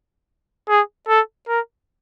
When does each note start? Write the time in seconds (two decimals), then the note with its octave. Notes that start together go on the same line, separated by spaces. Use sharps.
0.69 G#4
1.08 A4
1.48 A#4